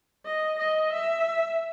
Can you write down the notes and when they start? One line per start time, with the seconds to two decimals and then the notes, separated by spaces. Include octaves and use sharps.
0.25 D#5
0.59 D#5
0.93 E5